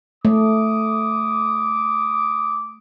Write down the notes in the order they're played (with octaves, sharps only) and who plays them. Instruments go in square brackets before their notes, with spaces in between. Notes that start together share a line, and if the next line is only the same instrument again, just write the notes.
[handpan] A3 [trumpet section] D6 D#6